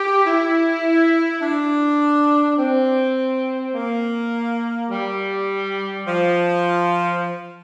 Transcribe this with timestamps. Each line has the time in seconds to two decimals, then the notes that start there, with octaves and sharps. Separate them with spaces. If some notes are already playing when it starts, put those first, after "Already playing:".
Already playing: G4
0.25 E4
1.41 D4
2.58 C4
3.74 A#3
4.90 G3
6.06 F3